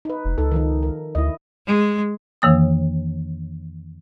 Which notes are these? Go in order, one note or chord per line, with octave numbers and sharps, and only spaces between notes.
D#4 B4
F1
C#2 D#4 A4
D#3 F3 D#4
A#4
D2 E4 D#5
G#3
F2 D#3 E3 A#3 D#6